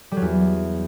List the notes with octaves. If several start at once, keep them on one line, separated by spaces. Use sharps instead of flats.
G3
F#3
E2